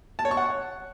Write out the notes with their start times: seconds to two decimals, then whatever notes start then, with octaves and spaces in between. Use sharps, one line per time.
0.19 A5
0.25 C#5
0.31 C#6
0.37 F#5